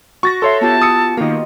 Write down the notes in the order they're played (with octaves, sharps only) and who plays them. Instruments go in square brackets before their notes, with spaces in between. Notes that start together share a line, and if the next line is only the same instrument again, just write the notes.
[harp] F#4 [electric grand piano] C#6 A6 A#6
[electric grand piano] A4 C#5 E5 [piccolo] C6
[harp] B3 F4 G4 [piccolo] A5
[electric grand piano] D#6 E6 C#7
[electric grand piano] D#3 A#3 [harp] F4 D#5